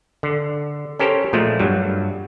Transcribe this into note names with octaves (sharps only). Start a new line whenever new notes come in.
D3
C#4 G4 A4 A#4 C5 C#5
A#2 F3 G#3 A3
G2 F#3 G3